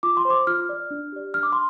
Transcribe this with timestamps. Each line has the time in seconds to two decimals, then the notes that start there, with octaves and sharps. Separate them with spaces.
0.03 F4 D6
0.17 C6
0.25 C5
0.30 D6
0.47 F4 F6
0.69 D5
0.91 D4
1.12 G4 D5
1.34 D4 F6
1.43 D6
1.53 C6